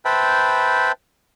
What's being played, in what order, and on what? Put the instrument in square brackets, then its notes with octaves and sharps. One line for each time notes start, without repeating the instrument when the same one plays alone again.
[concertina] B4 C5 E5 G5 A5 B5